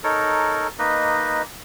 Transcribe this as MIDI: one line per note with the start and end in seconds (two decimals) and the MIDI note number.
0.04 0.67 63
0.04 0.67 69
0.04 0.67 70
0.04 0.67 73
0.79 1.42 58
0.79 1.42 63
0.79 1.42 71
0.79 1.42 75